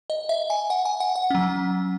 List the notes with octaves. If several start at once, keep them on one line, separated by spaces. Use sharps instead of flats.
D#5
E5
G#5
F#5
G#5
F#5
F#5
F#3 C#4